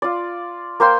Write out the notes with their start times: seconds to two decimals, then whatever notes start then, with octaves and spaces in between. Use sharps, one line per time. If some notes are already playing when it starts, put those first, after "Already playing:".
0.02 F4 D5
0.80 A#3 C5 G5 C6